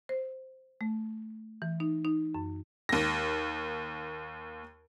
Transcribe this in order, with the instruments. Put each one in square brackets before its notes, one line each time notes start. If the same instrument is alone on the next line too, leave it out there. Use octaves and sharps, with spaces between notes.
[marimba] C5
A3
E3
D#4
D#4
F#2
[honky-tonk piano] D#2 A#6